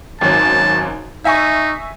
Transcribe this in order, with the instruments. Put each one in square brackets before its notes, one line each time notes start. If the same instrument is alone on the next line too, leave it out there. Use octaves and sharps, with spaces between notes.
[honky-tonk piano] G#1 F#2 C#5 [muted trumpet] A5
[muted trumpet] D#4 [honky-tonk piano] E5 G#5 C#6